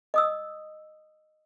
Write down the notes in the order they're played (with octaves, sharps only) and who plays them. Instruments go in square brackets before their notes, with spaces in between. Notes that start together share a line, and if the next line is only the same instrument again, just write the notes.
[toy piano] D#5 D#6 E6